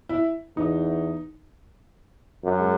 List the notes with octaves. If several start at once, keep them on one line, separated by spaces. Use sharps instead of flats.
E4
E2 D#4
F#2
G#3